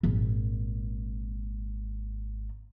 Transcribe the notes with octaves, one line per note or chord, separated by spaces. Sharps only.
G#1 A#2